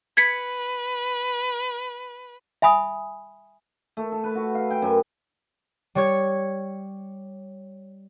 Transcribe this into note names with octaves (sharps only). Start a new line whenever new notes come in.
B4 G#6 B6 C#7
E5 G#5 B5 D#6
A3
A4
B4
F#4
F5
G5
F#2
G3 C#5 G#6